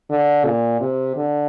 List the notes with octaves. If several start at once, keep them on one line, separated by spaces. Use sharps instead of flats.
D3
A#2
C3
D3